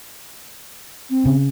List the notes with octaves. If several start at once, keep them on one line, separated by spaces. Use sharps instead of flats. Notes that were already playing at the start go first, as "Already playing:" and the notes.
C4
C#3